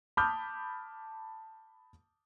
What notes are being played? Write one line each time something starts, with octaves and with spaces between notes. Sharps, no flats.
A5 B5 D6 D#6 F6 G6